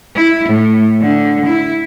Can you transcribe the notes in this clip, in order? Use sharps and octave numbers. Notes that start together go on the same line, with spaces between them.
E4
A2
D3
E4